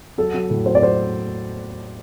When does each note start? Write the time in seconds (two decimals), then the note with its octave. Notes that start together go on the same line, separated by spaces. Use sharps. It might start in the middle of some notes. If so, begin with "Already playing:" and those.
0.18 F#3 A4
0.34 F#3
0.50 A2
0.66 F#3 C5
0.75 D5
0.82 F#3 C5